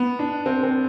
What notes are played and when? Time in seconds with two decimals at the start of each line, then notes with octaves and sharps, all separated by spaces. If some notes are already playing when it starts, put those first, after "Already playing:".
Already playing: B3
0.19 D4
0.46 C4
0.63 C4